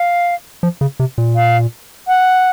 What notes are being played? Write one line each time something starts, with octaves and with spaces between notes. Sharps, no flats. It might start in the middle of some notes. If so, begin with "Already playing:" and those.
Already playing: F5
F3
C#3
C3
A#2
F5
F#5